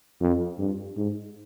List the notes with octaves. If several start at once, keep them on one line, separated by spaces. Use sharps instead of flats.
F2
G2
G#2